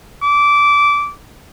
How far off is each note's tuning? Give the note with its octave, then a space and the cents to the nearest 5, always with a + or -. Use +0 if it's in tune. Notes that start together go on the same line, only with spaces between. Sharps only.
D6 -15